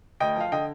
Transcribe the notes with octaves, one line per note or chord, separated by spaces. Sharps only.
D2 D#5 G5
F3 F5
D3 D#5 G5